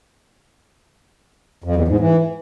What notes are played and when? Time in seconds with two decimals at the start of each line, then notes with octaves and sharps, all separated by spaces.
1.64 F2
1.76 E2
1.88 G#2
2.00 E3